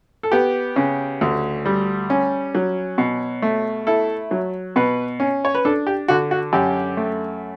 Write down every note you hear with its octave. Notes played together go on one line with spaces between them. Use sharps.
A4
B3 G4
C#3
D2
G3
C#4
F#3
B2
A3
E4 A4
F#3
B2 B4
C#4
C#5
B4
D4 A4
G4
D3 F#4
F#4
F#2 G4
A3